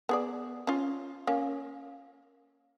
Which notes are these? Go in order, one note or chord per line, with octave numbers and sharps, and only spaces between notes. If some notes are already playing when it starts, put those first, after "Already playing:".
B3 G#4 D5
C#4 F4
A#3 C#4